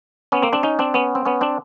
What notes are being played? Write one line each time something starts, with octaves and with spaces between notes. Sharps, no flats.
B3 C#4
A#3 C4
C4 D4
C#4 D#4
C4 D4
B3 C#4
C4
B3 C#4
C4 D4